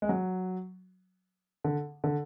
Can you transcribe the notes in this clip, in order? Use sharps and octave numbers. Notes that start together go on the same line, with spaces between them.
G#3
F#3
D3
D3